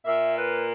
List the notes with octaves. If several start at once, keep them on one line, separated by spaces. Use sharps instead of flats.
A#2 A#3 E5
B4